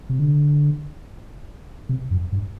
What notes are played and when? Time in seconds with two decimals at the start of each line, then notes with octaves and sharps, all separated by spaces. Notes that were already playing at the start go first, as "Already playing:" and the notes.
0.09 C3
0.19 D3
1.89 C3
2.11 F#2
2.32 G2